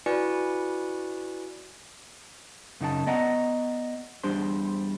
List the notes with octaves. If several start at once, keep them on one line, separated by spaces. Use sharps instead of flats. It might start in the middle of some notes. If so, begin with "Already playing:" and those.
E4 F#4 B4 D5 G#5 C#7
F#2 C#3 D#4 F4 A5
B3 D5 D#5 F#5 A#5
E2 G3 D4 C5 C6